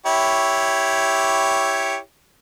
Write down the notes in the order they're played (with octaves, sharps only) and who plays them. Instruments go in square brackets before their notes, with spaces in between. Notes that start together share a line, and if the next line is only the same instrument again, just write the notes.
[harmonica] E4 G4 C#5